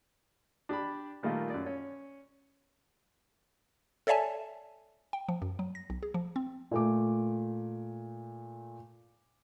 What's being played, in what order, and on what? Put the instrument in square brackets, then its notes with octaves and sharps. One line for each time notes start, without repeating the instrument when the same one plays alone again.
[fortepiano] D4 G4 D5 B5
A#2 D#3 G3 A3 A#3 F4
F#2 D5
C#4
[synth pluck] A4 C#5 D5 E5 G#5 A5
[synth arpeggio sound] G5
F3
F#2
F#3
A#6
B1
G#4
F3
C4
[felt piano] A#2 A3 D6